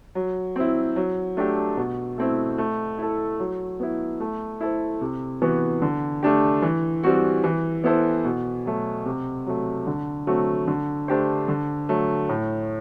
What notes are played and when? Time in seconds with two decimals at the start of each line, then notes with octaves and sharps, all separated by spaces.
0.15 F#3
0.56 C4 E4
0.96 F#3
1.37 A3 D4 G4
1.77 B2
2.18 A3 C4 E4
2.58 A3
2.98 E4 A4
3.40 F#3
3.80 B3 E4
4.20 A3
4.61 E4 A4 C5
5.01 C3
5.42 E3 B3 F#4
5.82 D3
6.23 A3 D4 G4
6.62 E3
7.03 G3 C4 F#4
7.44 E3
7.84 B3 E4 A4 C5
8.25 B2
8.66 F#3 A3
9.06 C3
9.46 F#3 A3
9.87 D3
10.27 F#3 A3 C4 F#4
10.67 D3
11.08 A3 D4 G4 C5
11.48 D3
11.89 F#3 A3
12.29 A2